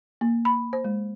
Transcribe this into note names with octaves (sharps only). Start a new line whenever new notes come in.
A#3
B5
C5
G#3